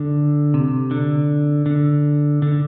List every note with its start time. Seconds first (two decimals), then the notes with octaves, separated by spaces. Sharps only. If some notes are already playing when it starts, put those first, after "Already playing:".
Already playing: D3
0.54 C3
0.91 D3
1.66 D3
2.42 D3